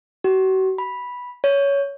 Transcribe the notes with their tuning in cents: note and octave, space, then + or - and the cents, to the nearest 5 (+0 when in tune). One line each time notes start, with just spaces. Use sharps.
F#4 +40
B5 -10
C#5 +15